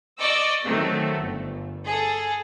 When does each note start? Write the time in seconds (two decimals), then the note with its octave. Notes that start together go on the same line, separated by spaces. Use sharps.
0.19 D5 D#5 C#6 D6 E6
0.65 D#3 F#3 A3 B3 C4
1.17 G1
1.86 G#4 A4